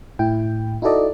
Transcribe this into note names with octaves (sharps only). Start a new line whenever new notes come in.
A2 E4 G5
D#4 E4 F#4 A4 D5 D#5